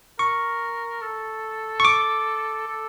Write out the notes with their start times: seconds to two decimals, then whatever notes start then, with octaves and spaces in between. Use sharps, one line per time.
0.19 A#4 C#6
1.02 A4
1.80 C#6
1.85 D6
2.67 A4